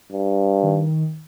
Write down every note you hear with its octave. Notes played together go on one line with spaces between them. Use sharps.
G2
D#3